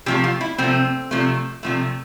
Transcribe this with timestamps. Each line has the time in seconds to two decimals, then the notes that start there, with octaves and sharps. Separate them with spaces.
0.06 C3 F3 A3 G4
0.24 F4
0.41 E4
0.58 C3 F3 A3 C4
1.11 C3 F3 A3
1.63 C3 F3 A3